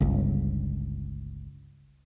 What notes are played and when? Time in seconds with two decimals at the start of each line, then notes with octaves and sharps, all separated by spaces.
0.01 G1 C#2